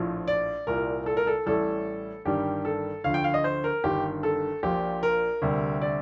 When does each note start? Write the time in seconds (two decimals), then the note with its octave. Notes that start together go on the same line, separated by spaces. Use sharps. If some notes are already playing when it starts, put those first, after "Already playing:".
Already playing: A#1 A2 F3
0.28 D5
0.67 C2 A#2 G3 A#4
1.06 A4
1.17 A#4
1.27 A4
1.46 A1 A2 G3 A4
2.25 G1 G2 D#3 G3 G4
2.65 A4
3.04 D2 D3 F3 F5
3.14 G5
3.24 F5
3.34 D#5
3.44 C5
3.64 A#4
3.84 G1 G2 D#3 G4
4.23 A4
4.63 A#1 A#2 F3 G4
5.03 A#4
5.42 D2 C3 G3
5.82 D5